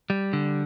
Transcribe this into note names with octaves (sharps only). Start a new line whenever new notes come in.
G3
D3